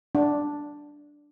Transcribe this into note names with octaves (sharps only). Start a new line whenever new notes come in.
D4